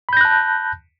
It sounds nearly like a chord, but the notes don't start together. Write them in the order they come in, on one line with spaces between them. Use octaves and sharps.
B5 G6 A#6 F#6 A5